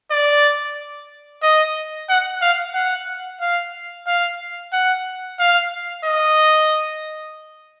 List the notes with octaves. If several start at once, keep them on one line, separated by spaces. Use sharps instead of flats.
D5
D#5
F#5
F5
F#5
F5
F5
F#5
F5
D#5